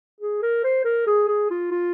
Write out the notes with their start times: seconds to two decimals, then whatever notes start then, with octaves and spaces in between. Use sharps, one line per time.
0.21 G#4
0.43 A#4
0.64 C5
0.85 A#4
1.07 G#4
1.28 G#4
1.51 F4
1.72 F4